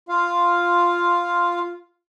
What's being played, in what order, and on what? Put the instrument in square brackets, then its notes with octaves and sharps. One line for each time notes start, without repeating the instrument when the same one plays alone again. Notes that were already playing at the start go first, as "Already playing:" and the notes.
[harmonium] F4 F5